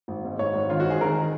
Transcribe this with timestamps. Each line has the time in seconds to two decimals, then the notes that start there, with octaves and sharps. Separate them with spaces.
0.08 G#1
0.25 G#2
0.39 G#1 C#5
0.54 G#1
0.70 D#3 F4
0.80 F#4
0.86 G#1 G#4
1.01 D#3 A#4